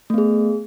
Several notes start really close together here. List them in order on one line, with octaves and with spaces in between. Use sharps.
A3 B3 G#4